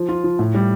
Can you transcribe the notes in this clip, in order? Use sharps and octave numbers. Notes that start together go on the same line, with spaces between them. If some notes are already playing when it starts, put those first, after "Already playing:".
Already playing: F3
F4
F3
A2
G3